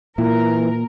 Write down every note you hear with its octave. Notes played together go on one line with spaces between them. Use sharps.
A#2 E3 A#4